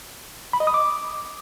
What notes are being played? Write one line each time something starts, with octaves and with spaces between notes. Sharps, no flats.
B5
D#5
D#6
D6